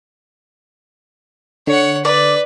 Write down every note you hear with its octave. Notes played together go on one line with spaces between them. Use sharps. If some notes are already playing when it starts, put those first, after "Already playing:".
D3 C#5 F#5
B4 D5